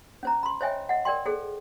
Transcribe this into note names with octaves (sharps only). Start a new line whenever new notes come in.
C#4 C5 A#5
B5 C6
C5 C#5 D#5 E5 G5 G#5
D#5 F#5
A#4 D5 G5 C6
G#4 A4 C5